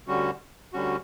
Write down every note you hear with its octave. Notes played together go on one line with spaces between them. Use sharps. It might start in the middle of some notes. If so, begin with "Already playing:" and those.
D2 D3 G3 C#4 F#4
D2 D3 G3 C#4 F#4